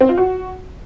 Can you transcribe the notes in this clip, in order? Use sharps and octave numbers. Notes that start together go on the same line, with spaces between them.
C4
F4
F#4